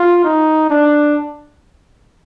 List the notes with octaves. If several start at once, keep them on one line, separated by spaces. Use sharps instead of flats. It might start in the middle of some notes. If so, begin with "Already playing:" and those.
Already playing: F4
D#4
D4